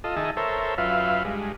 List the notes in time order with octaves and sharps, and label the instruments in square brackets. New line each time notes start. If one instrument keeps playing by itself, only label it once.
[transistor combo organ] F4 A4 D#5
D#3 G#4 D#5 E5 A5
A4 A#4 C5 C#5 E5
F#2 F4 B4 E5 F5
G2 G#3